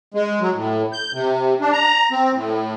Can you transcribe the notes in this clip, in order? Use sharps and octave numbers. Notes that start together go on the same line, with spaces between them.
G#3
F#3
A2
G6
C3
D4
A#5
C4
A2